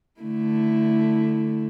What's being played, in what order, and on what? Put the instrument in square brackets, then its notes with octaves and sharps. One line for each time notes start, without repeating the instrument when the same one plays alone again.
[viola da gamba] D3 A3 E4